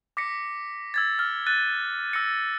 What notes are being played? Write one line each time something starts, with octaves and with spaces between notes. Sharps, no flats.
D6 A#6 B6 C#7
E6 G#6 A6
F6
F#6 A6 D#7
E6 A#6 C#7